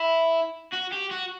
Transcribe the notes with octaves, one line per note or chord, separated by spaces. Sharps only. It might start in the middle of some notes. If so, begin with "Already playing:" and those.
Already playing: E4
F#4
G4
F#4